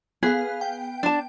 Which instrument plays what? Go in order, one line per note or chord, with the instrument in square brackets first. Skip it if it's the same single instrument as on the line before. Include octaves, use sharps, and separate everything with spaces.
[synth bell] B3 F5 [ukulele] G#4
[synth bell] G5
[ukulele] D4 A5